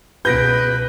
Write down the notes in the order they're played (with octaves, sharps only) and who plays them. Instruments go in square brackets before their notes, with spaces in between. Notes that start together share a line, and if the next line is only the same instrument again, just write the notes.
[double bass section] C#2 B2 [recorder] B4 [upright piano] G6 A#6 D7